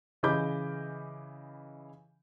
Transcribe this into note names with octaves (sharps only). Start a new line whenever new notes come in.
C#3 E3 D#5 B5 D6 G6